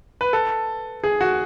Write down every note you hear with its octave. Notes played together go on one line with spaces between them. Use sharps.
B4
A4
G#4
F#4